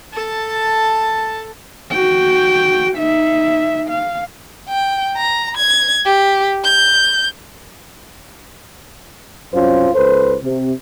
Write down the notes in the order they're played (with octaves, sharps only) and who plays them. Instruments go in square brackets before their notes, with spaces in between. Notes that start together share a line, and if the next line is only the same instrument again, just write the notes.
[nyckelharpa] A4 A5
[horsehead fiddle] F#4 G5
D#4 E5
F5
[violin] G5
A#5
G#6
G4
G6
[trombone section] C2 F#2 C#4 F4 C5
C#2 A4 B4 C5
C3